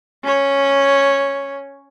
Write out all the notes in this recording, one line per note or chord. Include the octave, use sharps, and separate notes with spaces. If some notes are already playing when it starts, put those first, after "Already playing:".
C#4 C#5